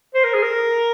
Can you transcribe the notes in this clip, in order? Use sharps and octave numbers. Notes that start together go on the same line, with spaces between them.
C5
A#4
G#4
A#4